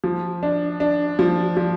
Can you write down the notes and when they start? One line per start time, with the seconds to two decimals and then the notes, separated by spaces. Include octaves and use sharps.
0.04 F3
0.43 D4
0.80 D4
1.19 F3
1.57 F3